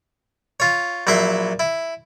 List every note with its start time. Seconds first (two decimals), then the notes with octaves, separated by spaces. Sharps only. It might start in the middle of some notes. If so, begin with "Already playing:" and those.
0.60 F4 C#5
1.07 A#1 F#3 E4 E5 C6
1.59 E4